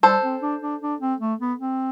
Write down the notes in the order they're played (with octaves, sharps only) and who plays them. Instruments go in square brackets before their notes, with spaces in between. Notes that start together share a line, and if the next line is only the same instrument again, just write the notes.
[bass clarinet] G3 [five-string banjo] A4 C5
[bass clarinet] C4
D4
D4
D4
C4
A3
B3
C4